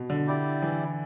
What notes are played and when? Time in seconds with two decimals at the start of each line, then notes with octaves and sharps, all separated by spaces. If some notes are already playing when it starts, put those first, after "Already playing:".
Already playing: B2
0.10 D3
0.27 E4 G4 D5
0.62 E3